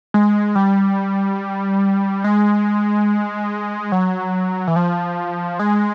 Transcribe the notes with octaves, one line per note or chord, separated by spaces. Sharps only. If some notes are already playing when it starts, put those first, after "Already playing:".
G#3
G3
G#3
F#3
E3
F3
G#3